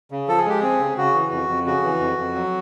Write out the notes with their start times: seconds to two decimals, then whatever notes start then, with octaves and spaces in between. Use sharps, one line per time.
0.11 C#3
0.28 F3 A4
0.38 G#4
0.45 G#3 G4
0.60 C4 G#4
0.79 C#3
0.97 C#3 F#4
1.14 E3
1.32 F2
1.48 F2
1.66 C#3 F#4
1.84 E3
2.00 F2
2.18 F2
2.35 F#3